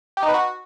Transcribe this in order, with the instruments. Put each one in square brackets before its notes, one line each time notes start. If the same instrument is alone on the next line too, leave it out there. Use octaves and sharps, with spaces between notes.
[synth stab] G4
D#4
B4
F#4